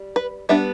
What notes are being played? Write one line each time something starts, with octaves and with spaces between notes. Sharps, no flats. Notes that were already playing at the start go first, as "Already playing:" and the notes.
Already playing: G3
B4
G3 B3 D4 E5